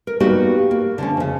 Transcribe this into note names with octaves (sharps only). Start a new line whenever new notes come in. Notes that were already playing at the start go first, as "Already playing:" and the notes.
A#4
G3 A#3 B3 D#4 F#4 G4
A#3
D3 F3 C#4
F2 C#3